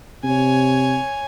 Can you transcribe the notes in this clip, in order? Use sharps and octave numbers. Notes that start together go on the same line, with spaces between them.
C3 C#5 G#5